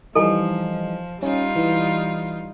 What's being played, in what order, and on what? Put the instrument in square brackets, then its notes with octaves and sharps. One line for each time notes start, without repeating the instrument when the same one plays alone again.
[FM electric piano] E3 G3 D#4 [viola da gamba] F3 [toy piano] A4 G#5
[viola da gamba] G3 D#4 F4 [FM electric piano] C#4
[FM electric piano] E3